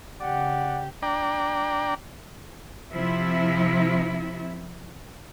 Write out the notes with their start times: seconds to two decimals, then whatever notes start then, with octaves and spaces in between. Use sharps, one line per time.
0.21 C#3 G4 D5 F#5
1.03 D4 D5 G5 A#5
2.91 C3 F3 E4